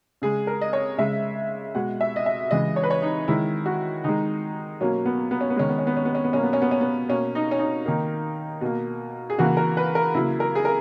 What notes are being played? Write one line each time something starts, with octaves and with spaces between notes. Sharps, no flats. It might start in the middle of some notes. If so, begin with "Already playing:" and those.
C#3 G#3 G#4
A#4
D#5
C#5
C#3 G#3 E5
B2 G#3 F#5
E5
D#5
E5
C#3 E3 G#3 D#5
C#5
B4
C#5
D#4
D#3 G#3 E4
F#4
D#3 G#3 D#4
B2 F#3 A#3 C#4
B3
B3
C#4
B3
D#3 G#3 C#4
B3
C#4
B3
C#4
B3
C#4
B3
B2 F#3 A#3 C#4
B3
C#4
B3
C#4
B3
B2 A#3 C#4
D#4
C#4
D#4
D#3 A#3
B2 A#3
G#4
C#3 E3 A#3 F#4
A#4
B4
A#4
C#3 F#3 A#3 E4
A#4
G#4
A#4